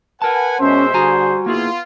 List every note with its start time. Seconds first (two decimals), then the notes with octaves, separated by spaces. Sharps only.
0.22 A#4 B4 F#5 G#5 A5
0.60 B2 G#3 C#4 C5 E5
0.94 D3 G3 F#4 G#4 G#5 A#5
1.46 A#3 B3 E4 F4 G#4